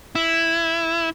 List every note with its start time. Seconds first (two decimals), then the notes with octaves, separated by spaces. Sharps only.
0.15 E4